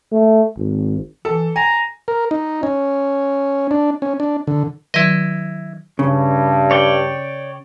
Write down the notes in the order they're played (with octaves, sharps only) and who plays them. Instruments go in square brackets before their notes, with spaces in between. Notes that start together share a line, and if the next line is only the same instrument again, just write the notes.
[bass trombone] A3
G#1
[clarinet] E3 [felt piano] A4
[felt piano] G#5 [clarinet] A#5
[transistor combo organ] A#4
D#4
C#4
D4
C#4
D4
D3
[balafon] D#3 F#3 E5 [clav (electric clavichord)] E4 D#5
[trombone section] G2 [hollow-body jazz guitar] C#3
[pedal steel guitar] C#5 D5 G5